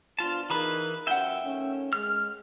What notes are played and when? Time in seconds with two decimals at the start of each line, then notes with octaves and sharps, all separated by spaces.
0.19 F3 B3 D4 F4 A5
0.50 E3 D#4 F4 G#4 A#4 B4 A#5 B5
1.07 F#2 F4 E5 F#5 G5
1.43 D#3 A3 C#4
1.93 G#3 F6